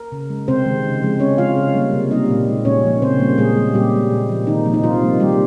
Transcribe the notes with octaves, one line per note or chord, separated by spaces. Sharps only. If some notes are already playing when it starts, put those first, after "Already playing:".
Already playing: A#4
C#3
G#3
C3 C4 C5
D#3 G#3
C#3
F3 G#3
C#3 C#4 C#5
G#3 F4 F5
C#3
G3 A#3
C3
G3 A#3 D#4 D#5
A#2
G#3
A#2 C#4 C#5
F3 A#3
C#3 C4 C5
G3 A#3
A#2 G#3 G#4
G3 A#3
A#2 G3 G4
G#3
A#2
F3 A#3
C3 D#3 D#4
F3 A#3
D#4
C3 F3 F4
G3 A#3
D#3 G3 G4